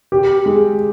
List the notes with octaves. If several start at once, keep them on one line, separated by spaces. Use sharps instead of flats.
G4
G#3